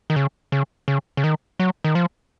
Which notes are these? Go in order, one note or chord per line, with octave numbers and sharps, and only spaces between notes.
D#3
C#3
C#3
C#3
C#3
D#3
F#3
D#3
F3